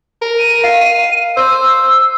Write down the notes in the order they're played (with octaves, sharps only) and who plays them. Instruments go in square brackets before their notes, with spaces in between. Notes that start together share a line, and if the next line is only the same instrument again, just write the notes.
[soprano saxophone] A#4
[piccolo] D#7
[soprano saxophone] F5
[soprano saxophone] C5 [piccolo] E6